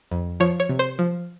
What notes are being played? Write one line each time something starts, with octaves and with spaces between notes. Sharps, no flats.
F2
F3 C#5
C#5
C3
C5
F3